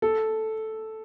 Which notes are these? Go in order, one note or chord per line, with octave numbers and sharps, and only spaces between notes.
A4